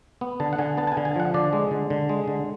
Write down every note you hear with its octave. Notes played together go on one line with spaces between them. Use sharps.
B3
D3 A5
F#5
D3 G#5
B3 A5
A5
G#5
D3
G#5
F3 F#5
D3 D5
G#3
D3
D3
G#3
D3